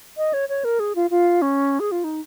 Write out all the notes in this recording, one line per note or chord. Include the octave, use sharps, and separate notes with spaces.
D#5
C#5
C#5
A#4
G#4
F4
F4
C#4
G#4
F4
D#4